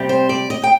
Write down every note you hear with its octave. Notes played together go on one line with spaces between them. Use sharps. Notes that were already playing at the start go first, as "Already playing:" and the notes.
Already playing: C3 G3 C4
C5
D5
D#5
G5